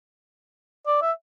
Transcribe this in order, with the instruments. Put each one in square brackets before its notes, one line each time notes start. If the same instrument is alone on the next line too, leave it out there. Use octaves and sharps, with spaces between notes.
[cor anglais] D5
E5